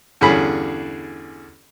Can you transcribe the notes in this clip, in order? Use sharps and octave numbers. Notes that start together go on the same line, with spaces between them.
E2 G2 D3 C#4 G#4 B5